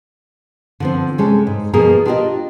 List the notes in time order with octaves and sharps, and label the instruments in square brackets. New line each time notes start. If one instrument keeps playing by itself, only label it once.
[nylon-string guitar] D3 F3 C4
C3 G#3 C#4 A4
G#2
B2 F3 A#3 G#4 A#4
D4 F4 G4 G#4 A#4 D#5